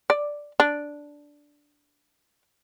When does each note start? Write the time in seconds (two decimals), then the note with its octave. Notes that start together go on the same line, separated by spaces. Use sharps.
0.10 D5
0.60 D4